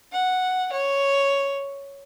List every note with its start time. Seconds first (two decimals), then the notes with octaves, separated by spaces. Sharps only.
0.12 F#5
0.72 C#5